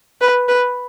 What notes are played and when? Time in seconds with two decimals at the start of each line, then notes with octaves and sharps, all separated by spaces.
0.21 B4
0.48 B4